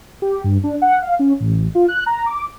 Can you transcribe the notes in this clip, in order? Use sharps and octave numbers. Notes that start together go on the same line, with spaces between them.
G4
G2
D4
F#5
F5
C#4
A1
F4
F#6
A#5
D6